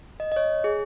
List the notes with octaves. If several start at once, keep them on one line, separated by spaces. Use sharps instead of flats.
D#5
D#5
C#5
G#4